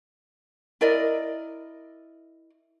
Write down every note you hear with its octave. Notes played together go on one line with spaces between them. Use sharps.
E4 A#4 D5 D#5